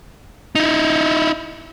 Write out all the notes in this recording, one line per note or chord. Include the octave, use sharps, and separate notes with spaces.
D#4 E4